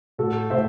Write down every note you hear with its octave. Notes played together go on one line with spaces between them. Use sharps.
A2 F#4 A4
A2 C5 E5